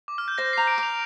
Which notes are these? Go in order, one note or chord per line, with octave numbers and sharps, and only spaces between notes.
D6
F6
G6
C5 A#6
A#5 C7
D7
D6
F7